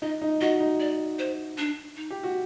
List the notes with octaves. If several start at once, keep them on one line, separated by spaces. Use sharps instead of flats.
D#4 D#5
D#4
F#4 D#5
D#4
D5
C5
D4
D#4
G4
F#4